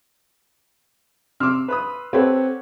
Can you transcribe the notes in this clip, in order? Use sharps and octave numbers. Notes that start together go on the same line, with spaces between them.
C3 C6 D6 E6 F6
B4 B5 D#6
C4 G4 A4 B4 C#5 F#5